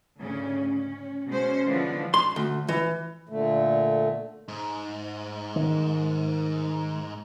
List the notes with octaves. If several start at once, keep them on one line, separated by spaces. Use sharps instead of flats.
D2 G#2 C#3 C#4
C#4
B2 G#3 C#4 C5
D3 E3 F3 G#3 B3 D4
C6
D2
E3
A#2 D3 A3
G#2
D#3